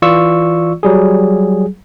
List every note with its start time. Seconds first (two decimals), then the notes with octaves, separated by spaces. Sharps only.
0.02 E3 F4 D5 C#6 E6
0.83 F#3 G3 G#4